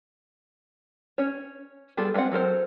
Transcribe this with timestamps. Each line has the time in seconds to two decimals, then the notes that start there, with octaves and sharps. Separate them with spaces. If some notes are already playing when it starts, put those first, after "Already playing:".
1.18 C#4 C#5
1.97 G3 B3 F4 G#4 A4
2.14 G#3 A3 B3 C4 F#5
2.32 F#3 A4 A#4 C5